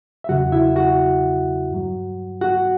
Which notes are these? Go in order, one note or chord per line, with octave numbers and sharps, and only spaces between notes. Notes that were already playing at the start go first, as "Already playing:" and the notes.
E5
E2 C#3 F#3 F#4 F#5
E4 E5
F#4 F#5
G2 F#3
F#4 F#5